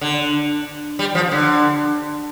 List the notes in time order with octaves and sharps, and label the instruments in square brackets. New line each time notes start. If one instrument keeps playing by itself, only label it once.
[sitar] D3
G3
F3
D3